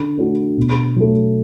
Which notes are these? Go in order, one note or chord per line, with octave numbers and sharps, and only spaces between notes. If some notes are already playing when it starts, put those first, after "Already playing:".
Already playing: D3
A3 D4 F#4
B2
F#3 A3